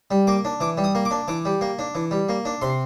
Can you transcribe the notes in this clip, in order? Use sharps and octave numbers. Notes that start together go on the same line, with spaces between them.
G3
A#3 D6
D4
E3 D6
G3
D#6
A#3
D6
D4
E3 D6
G3
A#3
D4
E3
G3
A#3
D4
C3 C6